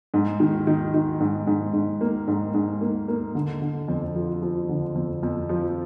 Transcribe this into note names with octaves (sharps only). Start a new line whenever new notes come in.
G#2
D#3
D#3
D#3
G#2
G#2
G#2
A#3
G#2
G#2
A#3
A#3
D3
D3
F2
F3
F3
D3
F2
F2
F3